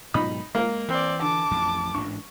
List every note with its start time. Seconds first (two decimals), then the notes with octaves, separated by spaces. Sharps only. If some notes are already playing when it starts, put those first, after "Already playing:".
0.14 G#2 B2 F#3 D#4 B5 D#6
0.55 G#3 A#3 A#4
0.88 E3 C4 D5
1.21 D3 A5 D6
1.51 A1 F2
1.95 A1 G#2 D4 C#6